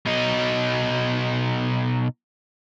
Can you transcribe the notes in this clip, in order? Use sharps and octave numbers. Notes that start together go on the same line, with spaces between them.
B2 D#4